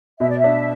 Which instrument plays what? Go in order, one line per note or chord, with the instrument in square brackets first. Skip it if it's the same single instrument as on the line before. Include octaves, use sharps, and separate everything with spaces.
[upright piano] B2 [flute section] E5
[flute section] D5
E5
[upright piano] D4